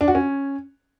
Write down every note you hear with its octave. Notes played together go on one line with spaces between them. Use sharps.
D4
F#4
C#4